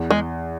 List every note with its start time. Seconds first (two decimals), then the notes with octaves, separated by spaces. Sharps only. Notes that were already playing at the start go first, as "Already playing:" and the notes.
Already playing: E2
0.11 G#3